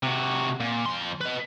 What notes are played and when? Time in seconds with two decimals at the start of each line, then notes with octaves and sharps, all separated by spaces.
0.03 C3 F#4
0.60 A#2
0.86 F2 C6
1.21 B4 D#5